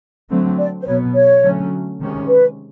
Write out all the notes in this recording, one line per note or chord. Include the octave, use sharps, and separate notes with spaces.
D3 F#3 A3 C4
D5
C5
B2 F#3 B3 C#5
C#5
D3 F#3 A3 C#4
C3 D#3 G#3 C#4
B4